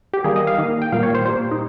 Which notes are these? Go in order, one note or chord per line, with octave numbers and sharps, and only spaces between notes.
G4
D#3 G3 A#3 G#4
D#5
F5
D#3 A#3
G5
A#2 G3 A#3 F5
C#5
C5
A#2 G3 A#3 C5
D#4